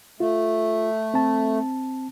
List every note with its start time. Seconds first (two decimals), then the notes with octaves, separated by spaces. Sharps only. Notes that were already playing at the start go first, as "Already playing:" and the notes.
0.20 A3 F4
1.14 C4 A5